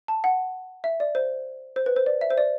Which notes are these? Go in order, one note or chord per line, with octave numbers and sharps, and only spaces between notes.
A5
F#5
E5
D5
C5
C5
B4
C5
D5
E5
C5
D5